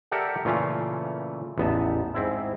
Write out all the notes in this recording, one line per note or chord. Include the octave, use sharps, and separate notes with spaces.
G4 A4 A#4 D5 E5 F#5
A#2 C#3 E3 A3 C#4 F4
A1 E2 B3 D#4 E5 A5
G#2 C4 E4